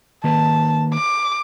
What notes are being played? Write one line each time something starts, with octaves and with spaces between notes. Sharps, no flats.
D#3 A#3 B4 A5
D6